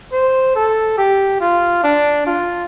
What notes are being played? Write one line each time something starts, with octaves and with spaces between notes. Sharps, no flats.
C5
A4
G4
F4
D4
F4